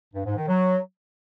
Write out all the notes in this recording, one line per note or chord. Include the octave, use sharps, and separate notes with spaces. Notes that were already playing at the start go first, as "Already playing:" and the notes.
G2
G#2
D#3
F#3